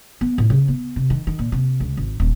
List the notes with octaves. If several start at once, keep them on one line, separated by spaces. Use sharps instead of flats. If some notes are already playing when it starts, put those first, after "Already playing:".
B3
A2
C#3
B3
C3
D#3
D#3
A#2
C3
C#2
G#1
D#1